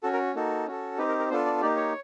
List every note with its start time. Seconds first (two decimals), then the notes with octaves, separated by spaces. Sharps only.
0.03 C#4 F#4 A4
0.13 A#4
0.35 A#3 D#4 F#4 A4
0.67 C#4 F#4 A4
0.98 C4 D#4 G4 B4
1.09 A#4
1.19 A#4
1.30 B3 D4 F4 A4 C5
1.46 D5
1.61 A#3 D#4 G4 D5
1.76 C#5